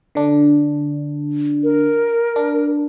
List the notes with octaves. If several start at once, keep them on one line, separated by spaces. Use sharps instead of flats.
D3 D4
A#4
D4